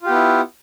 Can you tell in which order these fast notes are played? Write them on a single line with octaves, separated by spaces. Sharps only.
F4 G4 B3 E4